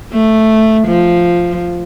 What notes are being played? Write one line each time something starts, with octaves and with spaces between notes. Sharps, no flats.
A3
F3